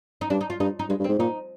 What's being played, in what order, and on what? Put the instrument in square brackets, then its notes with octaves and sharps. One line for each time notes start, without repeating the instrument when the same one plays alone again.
[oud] D#4
[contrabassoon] G2 [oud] D4
[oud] D#4
F4
[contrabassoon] G2 [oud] D#4
[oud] D#4
[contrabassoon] G2 [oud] G#3
[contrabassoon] G2
[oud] C4
[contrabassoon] G#2
[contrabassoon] A#2 [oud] D#4